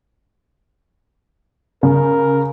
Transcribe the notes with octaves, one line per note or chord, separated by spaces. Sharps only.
C#3 A#4